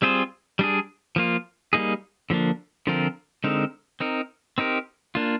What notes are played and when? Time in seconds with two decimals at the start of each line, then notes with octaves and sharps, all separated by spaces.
0.02 G3 C4 F4 G#4 C5
0.59 G3 D4 G#4
1.16 F3 A#3 F4
1.73 G3 A#3 D#4 G#4
2.30 D3 F3 A#3 D4
2.87 D3 F3 C4 F4 A#4
3.44 D3 G#3 C4 D#4 A#4
4.00 C4 D#4 A#4
4.58 C4 D#4 G4 A#4
5.15 A#3 D4 F4